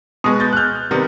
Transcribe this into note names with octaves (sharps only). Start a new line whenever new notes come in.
B2 G#3 B3 C#6 D#6
G6 A6
F#6
F6 G6
C3 D#3 G3 B3